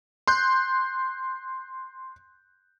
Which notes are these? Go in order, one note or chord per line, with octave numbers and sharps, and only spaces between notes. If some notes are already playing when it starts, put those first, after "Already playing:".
C6 F#6 G6